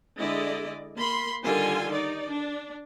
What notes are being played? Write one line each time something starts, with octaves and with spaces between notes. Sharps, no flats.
D3 G#3 E4 D5 D#5
A#3 B5 C6
D3 D#3 G3 F4 G#5 C6
D#4 D5
D4